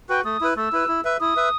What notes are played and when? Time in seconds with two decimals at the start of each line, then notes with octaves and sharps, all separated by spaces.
0.09 F#4 B4 G5
0.24 A3 D#6
0.41 E4 B4
0.56 A3 E6
0.73 E4 B4
0.88 E4
1.05 B4 E5
1.20 E4 D#6
1.36 B4 E5